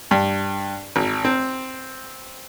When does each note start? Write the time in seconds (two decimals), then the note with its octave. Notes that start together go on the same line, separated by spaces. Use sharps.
0.11 G2
0.96 G#1
1.25 C4